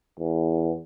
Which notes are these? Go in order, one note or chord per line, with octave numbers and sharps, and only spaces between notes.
E2